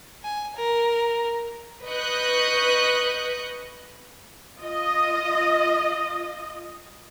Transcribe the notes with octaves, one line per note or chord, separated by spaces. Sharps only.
G#5
A#4
B4 D#5 C#6 D#6 F#6 G6
F4 D#5